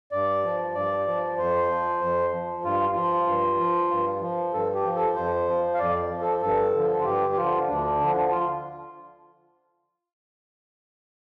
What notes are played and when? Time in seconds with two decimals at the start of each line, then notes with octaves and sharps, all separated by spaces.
0.12 G2 D5
0.44 F3
0.75 G2 D5
1.07 F3
1.38 F2 C5
1.69 F3
2.01 F2
2.32 F3
2.64 G2 F4
2.95 F3 F4
3.27 G2
3.59 F3
3.91 G2
4.21 F3
4.53 G2 A4
4.75 G4
4.85 F3
4.96 A4
5.16 F2 C5
5.48 F3
5.74 F5
5.79 F2 D5
6.10 F3
6.21 A4
6.42 G2 A4
6.74 D3 F3
7.01 F4
7.05 G2 G4
7.32 G4
7.37 D3 F3 F4
7.68 D2 D4
8.00 D3 F3
8.31 F4